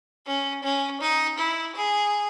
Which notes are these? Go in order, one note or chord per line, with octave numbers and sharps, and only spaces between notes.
C#4
C#4
D#4
E4
G#4